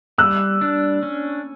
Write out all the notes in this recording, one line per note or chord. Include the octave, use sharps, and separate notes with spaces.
G3 E6 F#6
D4
C#4